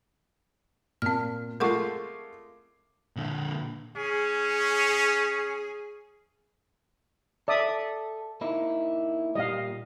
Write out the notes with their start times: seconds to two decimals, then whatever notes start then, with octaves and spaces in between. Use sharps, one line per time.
1.02 A#2 C4 F6
1.60 G#3 A3 F4 A#4 F#5 C#6 D6 C7
3.16 A#2 D3
3.97 C#4 G#4
7.48 A4 D5 E5 D#6
8.41 A#3 D#4 E4
9.35 A#2 G3 D#5 F5